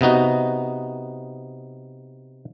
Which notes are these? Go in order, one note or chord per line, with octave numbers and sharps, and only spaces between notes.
C3 B3 D#4 F#4